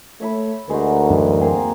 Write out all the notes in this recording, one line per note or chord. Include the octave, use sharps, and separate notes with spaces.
A3 C#5 E5 B5
D2 G#3 D#4 F#4 A#4
F#2 E3
A#3 C4 G#4